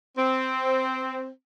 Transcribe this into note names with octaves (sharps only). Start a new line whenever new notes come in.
C4